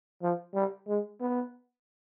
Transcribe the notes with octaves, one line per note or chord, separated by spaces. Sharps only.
F3
G3
G#3
B3